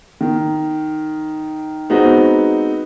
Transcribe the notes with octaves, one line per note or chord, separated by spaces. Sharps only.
D#3
G#3 B3 C4 D#4 F#4